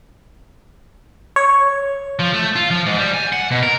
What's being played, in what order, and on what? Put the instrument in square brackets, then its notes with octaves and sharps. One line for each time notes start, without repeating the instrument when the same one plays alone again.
[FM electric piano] C#5
[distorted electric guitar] F3
A3
F4
F3
G#2
G3
G#5
F#5
B2
A#4